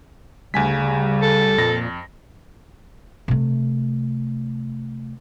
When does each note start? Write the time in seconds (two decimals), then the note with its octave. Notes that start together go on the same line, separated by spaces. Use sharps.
0.54 D2 C#3 G3 G#5 B6
1.22 A4
1.58 F2 A#2 A#6
3.28 C3 A3